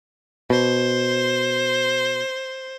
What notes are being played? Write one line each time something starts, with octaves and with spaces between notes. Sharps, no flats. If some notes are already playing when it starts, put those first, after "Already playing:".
B2 C5